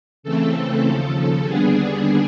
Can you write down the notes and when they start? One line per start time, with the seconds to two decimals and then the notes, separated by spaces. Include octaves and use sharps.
0.23 C#3 E3 A3 C4 A4
0.85 D#2 C#3 F3
1.46 D#2 D3 G3 B3 D4 G#4